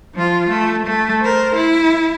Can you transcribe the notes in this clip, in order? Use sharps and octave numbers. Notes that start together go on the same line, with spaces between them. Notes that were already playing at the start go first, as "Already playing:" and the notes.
F3 F4
A3
A3
A#4 C5
E4